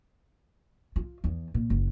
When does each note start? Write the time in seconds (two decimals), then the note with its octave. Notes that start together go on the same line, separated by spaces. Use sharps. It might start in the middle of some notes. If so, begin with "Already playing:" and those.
0.96 F4
1.24 E2
1.54 A#2
1.70 F#1